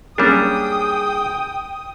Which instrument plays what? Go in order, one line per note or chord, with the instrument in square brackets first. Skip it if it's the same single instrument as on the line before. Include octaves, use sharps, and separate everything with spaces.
[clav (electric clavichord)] G3 D4 [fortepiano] A#3 C#4 [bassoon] G#4 [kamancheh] G5 D#6